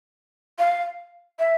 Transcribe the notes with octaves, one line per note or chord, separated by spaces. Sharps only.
F5
E5